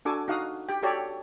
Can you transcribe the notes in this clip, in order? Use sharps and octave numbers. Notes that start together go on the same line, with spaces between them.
D4 F#4 A4 G#5 D6
D#4 F#4 F5 F#5 D#6
G4 G5
F#4 G4 A4 C#5 D5 G5